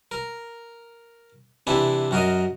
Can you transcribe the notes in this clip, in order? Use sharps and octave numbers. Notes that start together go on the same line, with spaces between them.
A#4
C3 E3 D4 E4
F#2 F#4 A#4 D#5